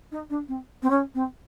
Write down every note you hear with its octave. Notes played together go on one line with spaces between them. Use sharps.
D#4
D4
C4
C4
C#4
C4